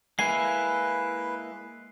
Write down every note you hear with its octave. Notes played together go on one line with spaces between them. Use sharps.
G#3 A#3 E4 B4 G#5 C7